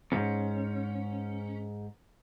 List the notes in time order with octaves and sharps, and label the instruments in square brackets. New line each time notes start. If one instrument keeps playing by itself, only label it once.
[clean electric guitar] F2 G#2 [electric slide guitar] C#4